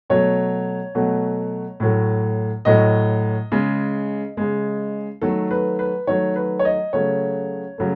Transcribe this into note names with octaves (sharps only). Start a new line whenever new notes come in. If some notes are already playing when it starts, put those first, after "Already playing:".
B2 F#3 A3 C#5
B2 F#3 A3
A2 F#3 A3
A2 F#3 A3 D#5
C#3 G#3
C#3 G#3
D#3 F#3 A3 A4
B4
B4
D#3 F#3 A3 C#5
B4
C#5
D#5
C#3 F#3 A3 C#5
C#3 F#3 A3